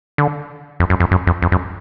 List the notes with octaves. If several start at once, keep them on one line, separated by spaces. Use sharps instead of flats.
D3
F2
F#2
F2
F#2
F2
F2
F#2